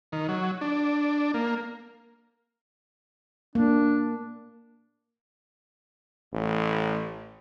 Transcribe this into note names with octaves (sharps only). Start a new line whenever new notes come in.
D#3
F#3
D4
A#3
A#3 D4
A1